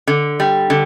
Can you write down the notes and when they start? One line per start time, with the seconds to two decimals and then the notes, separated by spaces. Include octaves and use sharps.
0.07 D3
0.40 G3
0.70 D3